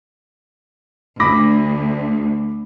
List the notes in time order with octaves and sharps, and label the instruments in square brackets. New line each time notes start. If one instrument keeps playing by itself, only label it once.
[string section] D2 [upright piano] B5 D6 A#6